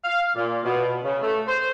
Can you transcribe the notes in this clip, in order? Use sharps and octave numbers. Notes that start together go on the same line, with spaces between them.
F5
A#2
B2
C#3
A3
C5